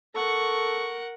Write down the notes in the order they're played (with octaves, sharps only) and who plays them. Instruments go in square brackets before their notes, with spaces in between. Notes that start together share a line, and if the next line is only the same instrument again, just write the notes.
[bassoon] A4 [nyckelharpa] A#4 F#5 [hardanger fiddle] C#6